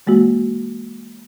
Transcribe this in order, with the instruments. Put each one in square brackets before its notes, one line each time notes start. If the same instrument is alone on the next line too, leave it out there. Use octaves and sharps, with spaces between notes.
[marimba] E3 G#3 A#3 F#4